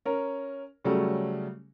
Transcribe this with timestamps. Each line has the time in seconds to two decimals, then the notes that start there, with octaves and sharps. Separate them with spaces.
0.05 C#4 A#4
0.85 C#3 F#3 G3 A3